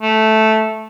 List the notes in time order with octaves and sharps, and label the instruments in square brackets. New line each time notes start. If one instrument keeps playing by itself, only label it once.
[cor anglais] A3